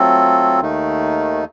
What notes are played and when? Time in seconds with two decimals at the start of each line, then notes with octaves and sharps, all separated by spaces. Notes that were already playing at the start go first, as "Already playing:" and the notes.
Already playing: F#3 A3 C4 F4 A4
0.60 D#2 D#3 A3 D#4